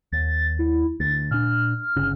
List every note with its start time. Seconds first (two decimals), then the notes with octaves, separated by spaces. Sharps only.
0.12 D#2 A6
0.59 E4
1.00 D2 A6
1.31 A#2 D4 F6
1.96 G1 C#3